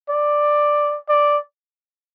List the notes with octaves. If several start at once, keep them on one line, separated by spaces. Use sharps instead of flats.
D5
D5